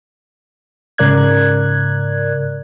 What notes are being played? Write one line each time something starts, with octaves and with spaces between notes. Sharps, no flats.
G#2 C#3 A#4 D5 F#6 G#6